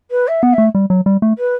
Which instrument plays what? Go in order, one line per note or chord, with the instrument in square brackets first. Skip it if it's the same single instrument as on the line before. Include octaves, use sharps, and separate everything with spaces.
[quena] B4
E5
[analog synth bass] B3 [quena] F#5
[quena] E5
[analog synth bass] A3
G3
F#3
G3
A3
[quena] B4